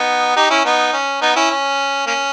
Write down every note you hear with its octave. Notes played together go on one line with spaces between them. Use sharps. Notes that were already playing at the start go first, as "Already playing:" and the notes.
Already playing: B3 D#4
D#4 G4
C#4 E4
B3 D#4
C#4
B3 D#4
C#4 E4
C#4
A#3 C#4